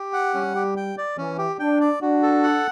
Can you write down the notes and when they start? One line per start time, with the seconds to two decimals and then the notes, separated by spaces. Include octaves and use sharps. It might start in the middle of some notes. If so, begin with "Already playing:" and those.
Already playing: G4
0.13 F#5
0.34 G3 C#4
0.55 G4
0.76 G5
0.98 D5
1.17 E3 C#4
1.38 G4
1.59 D4 G5
1.80 D5
2.02 D4 F#4
2.22 A4
2.43 F#5